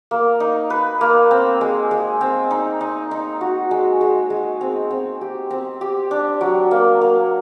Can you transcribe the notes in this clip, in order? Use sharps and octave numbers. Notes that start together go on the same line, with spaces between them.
A#3
D#4
B4
A#3
C4
G#3
G#3
C4
D#4
D#4
D#4
F#4
G#3
G#3
G#3
C4
C4
G4
C4
G4
D4
F#3
A#3
A#3